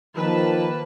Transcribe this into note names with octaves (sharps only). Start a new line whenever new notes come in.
D#3 F3 A#3 B4 A5